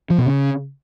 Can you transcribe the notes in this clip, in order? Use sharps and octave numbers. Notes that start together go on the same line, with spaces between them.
F3
B2
C#3